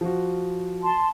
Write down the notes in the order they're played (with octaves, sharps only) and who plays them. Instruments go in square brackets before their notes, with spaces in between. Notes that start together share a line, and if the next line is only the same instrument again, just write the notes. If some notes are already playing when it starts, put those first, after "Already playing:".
[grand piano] F3 F#4
[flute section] A5 C6